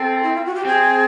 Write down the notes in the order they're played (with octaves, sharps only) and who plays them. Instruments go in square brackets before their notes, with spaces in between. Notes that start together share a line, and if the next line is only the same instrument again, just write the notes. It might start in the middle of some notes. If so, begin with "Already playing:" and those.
Already playing: [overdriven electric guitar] C4 [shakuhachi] A4
[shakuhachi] E4
F4
F#4
G4
[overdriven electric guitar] C4 [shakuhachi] G#4